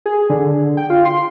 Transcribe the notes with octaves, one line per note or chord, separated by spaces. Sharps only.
G#4
D3
G5
F4
C6